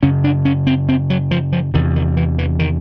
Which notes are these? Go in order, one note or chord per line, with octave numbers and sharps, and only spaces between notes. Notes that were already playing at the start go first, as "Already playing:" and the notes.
F#2 C#3 C#4
D4
C#4
C4
C4
F#3
F3
F3
E2 C3 D#3
D#3
E3
E3
D#3